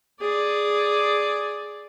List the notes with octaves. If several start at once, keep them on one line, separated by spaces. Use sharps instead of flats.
G#4 D5